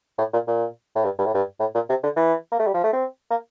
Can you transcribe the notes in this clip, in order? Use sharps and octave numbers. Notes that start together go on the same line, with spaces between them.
A2
A#2
A#2
A2
G2
G2
A2
G2
A2
A#2
C3
D3
E3
A#3
A3
G3
F3
A3
C4
A#3